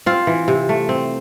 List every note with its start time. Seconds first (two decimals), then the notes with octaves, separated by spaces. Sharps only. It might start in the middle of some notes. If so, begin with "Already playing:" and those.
0.06 C4 F4
0.27 E3
0.48 C3
0.69 A3
0.89 C4